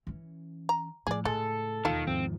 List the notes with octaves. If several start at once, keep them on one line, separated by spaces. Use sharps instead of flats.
E3 C#4
A#5
A2 F3 G#4 D5
C#3 G#3 A4
E1 D#2 D#3 F4 A4 A5
E2 G#2 D#3 F3 C4